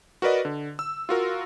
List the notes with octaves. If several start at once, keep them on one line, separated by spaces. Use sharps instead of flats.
F#4 A#4 B4 D5 D#5
D3
E6
F4 F#4 A#4